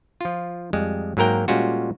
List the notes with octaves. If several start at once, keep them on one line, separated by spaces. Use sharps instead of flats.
F3 F4
F2 G3 G#3
G#2 F#3 A#3 A#4 G5
A#2 G3 G#3 C#4 F4 F#4